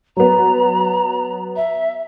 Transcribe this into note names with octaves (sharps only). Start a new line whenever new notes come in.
F#3 B3 A#5
E5